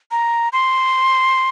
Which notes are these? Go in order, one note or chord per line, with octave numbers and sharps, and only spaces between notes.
A#5
C6